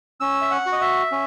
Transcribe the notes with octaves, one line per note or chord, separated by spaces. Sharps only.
C#4 E6
E5
F#5
F#4
D#5
E5
C#4